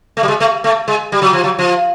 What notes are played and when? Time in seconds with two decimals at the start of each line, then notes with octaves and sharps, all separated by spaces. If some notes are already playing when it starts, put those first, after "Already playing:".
0.17 A3
0.23 G3
0.28 G#3
0.40 A3
0.64 A3
0.88 G#3
1.12 G3
1.22 F#3
1.33 F3
1.44 F#3
1.59 F3